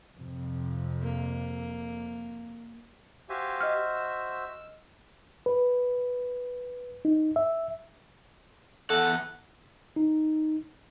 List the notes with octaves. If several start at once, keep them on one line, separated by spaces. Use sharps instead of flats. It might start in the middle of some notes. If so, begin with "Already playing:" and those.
F2 C3
A#3
F#4 G4 C5 E5 F5 G#5
D#5 F6
E6
B4
D#4
E5
E2 A4 F#5
D#4